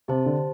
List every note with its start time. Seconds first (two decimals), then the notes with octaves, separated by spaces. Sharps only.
0.08 C3 G4 C5 A5
0.26 D3